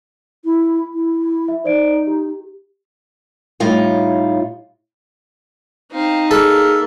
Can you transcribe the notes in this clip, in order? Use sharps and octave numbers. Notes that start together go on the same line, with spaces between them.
E4
E4
E5
D#4 C5 D5 D7
G4
A2 G3 D#4 F4 C#5
C4 D#4 F5
A#3 G#4 A4 B5 F6